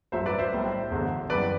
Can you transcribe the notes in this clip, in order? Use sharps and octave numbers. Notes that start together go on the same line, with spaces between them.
A1 G2 F#3 C5 E5
B4 D5
C5 E5
B1 A2 G3
E1 E2 D3
F#2 E3 G3 B4 D5